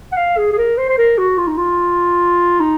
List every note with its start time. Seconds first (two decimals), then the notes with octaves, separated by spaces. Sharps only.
0.12 F#5
0.17 F5
0.38 G#4
0.52 G#4
0.58 A#4
0.78 C5
0.88 C5
0.98 A#4
1.18 F#4
1.38 F4
1.47 D#4
1.58 F4
2.60 D#4